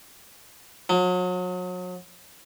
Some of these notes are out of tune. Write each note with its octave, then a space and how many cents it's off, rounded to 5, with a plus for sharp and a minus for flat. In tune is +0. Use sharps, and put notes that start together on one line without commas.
F#3 -35